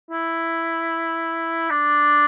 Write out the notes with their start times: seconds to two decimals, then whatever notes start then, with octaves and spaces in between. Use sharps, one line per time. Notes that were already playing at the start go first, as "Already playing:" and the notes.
0.11 E4
1.70 D4